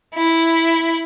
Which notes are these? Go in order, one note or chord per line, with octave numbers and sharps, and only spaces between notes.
E4